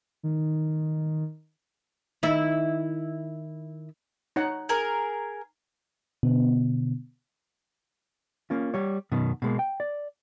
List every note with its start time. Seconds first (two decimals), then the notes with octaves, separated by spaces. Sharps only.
0.23 D#3
2.23 D#3 E4 E5
4.36 D#4 C#5 F#5
4.69 G#4 A#4
6.23 B2 D3 B3
8.50 A#3 C#4 F4
8.74 G3 C#5
9.12 F#2 B2 D#3
9.42 B2 G#3 A#3
9.59 G5
9.80 D5